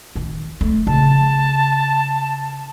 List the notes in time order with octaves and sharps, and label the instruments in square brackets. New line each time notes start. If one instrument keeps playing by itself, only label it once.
[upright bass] D#3
A3
[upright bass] C#3 [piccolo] A5